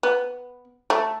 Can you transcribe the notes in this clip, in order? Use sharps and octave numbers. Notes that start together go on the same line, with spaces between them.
B3
A3